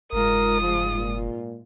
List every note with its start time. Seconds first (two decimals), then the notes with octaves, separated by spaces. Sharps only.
0.13 F#1 G#2 G#3 F4 A#4 D#6
0.61 F3
0.95 A#2